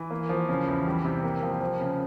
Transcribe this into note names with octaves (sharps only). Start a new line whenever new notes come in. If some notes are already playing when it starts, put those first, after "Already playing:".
Already playing: E3
A#3
F3
C#3
E2
G3
C3
A#3
F3
F3
C#3